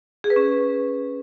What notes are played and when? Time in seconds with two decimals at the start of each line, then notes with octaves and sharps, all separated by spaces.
0.24 G#4
0.30 B4
0.36 C#4